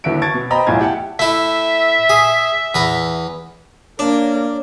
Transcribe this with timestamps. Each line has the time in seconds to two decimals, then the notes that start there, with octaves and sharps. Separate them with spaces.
0.04 D#2 D3 E3 F#4 E5 D7
0.22 A5 C#6 G#6 A6 D7
0.34 B2
0.50 C5 D#5 G5 A#5 B5
0.67 B1 E2 A2 E4 F4 G#6
0.79 E4 G4 F#5 A5
1.19 A3 E4 E5
2.10 G#4
2.75 E2 B4 A#5
3.99 A#3 D4 C#5